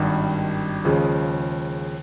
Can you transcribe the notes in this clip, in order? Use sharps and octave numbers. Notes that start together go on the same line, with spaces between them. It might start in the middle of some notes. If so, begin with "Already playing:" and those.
Already playing: G#1 G2 D#3 G3
D#2 C#3 F3 G#3